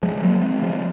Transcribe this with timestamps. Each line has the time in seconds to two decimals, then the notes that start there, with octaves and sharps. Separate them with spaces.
0.03 F3 G#3
0.23 F#3 A#3
0.42 G#3 C4
0.62 F3 G#3